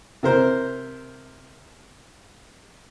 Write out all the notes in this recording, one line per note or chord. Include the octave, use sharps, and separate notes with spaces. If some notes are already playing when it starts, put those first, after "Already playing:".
C3 A#4 C5